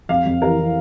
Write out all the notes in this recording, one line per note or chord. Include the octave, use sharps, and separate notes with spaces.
F2 F5
F2
E3 A#4
E3